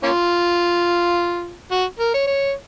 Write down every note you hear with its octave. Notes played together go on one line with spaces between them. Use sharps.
A#3 C#4 F4
F#4
A#4
C#5
C#5